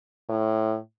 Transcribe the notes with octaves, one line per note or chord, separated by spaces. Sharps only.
A2